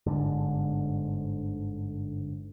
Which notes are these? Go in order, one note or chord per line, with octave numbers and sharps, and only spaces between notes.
G1 G#2 D3